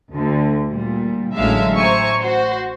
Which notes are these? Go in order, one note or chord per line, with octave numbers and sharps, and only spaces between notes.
D2 D3
A#2 G3
A1 D3 F#3 G#3 E5 F5
C5 E5 G#5 A#5 C#6
F#4 C5